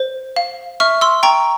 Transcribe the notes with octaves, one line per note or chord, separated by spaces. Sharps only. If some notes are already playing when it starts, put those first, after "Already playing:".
Already playing: C5
F5
E5 C#6 F6
C6 E6
G5 A#5 C#6